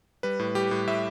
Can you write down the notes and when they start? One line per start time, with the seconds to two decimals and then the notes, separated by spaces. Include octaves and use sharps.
0.23 G3 B4
0.39 A2
0.55 G3 G4
0.71 A2
0.87 A2 E5